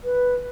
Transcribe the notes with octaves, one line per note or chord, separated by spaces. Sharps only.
B4